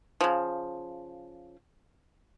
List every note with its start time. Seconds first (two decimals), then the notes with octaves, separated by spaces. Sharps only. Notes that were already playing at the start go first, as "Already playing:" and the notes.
0.21 C#3 F3